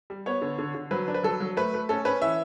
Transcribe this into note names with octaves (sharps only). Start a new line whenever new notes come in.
G3
B3 C#5
D3
D3
D3
F#3 B4
D4
B4
F#3 A4
F#3
A3 B4
A3
C#4 A4
C#4 B4
E3 E5